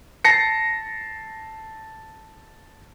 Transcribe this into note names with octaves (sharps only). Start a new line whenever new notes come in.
A5 A#6 C7 C#7